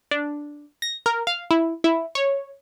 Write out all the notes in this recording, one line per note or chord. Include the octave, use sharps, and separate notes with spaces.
D4
A#6
A#4
F5
E4
E4
C#5